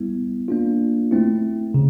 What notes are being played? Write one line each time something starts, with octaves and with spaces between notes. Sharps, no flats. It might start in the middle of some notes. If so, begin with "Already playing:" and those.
Already playing: G3 B3 E4
A#3 D4 F4
A3 C4 E4
C#3